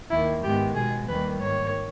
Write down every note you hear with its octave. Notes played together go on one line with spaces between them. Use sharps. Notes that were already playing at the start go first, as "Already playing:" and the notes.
D#2 D#3 A#3 E4
G#2 D#3 G#3 B3 G4
B2 G#3 B3 G#4
D#2 D#3 G3 A#3 B4
G#2 D#3 A#3 C#5